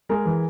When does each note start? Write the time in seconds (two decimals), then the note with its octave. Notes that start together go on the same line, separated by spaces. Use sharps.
0.09 G#3 G#4 A#4
0.26 E3